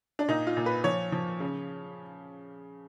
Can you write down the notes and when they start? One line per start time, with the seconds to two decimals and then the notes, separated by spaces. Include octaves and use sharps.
0.19 D4
0.28 A#2 D#4
0.47 F4
0.57 A#2
0.66 B4
0.84 F3 C#5
1.12 F3
1.40 C#3